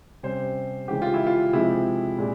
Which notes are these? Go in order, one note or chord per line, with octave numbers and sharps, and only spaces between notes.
C3 G3 C#4 C5
C#3 E3 G#3 G4
F4
E4
F4
C3 F3 G#3 C4 E4
A#2 G#3